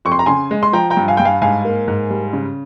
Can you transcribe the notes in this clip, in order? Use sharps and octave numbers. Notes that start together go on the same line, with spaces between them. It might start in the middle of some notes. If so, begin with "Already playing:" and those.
F2 C#6
C6
A#5
C#3 G#5 C6
G#3
C6
F3 G5 A#5
G5 A#5
G2
F5 G#5
G2 G5
F5 G#5
G#2 F5 G#5
A#3
G#2
G3
C#3